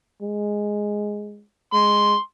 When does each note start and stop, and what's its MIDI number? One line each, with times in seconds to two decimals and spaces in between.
0.22 1.43 56
1.73 2.15 56
1.73 2.18 84